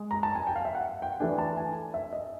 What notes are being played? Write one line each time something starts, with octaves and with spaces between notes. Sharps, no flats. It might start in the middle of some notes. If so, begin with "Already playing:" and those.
Already playing: G#3
A#5
A5
G#5
G5
F5
E5
F#5
G5
E3 A3 D4 G#5
A5
G#5
E5
D#5